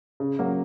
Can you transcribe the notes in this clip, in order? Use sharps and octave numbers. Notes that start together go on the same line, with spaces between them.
C#3
F#3 A#3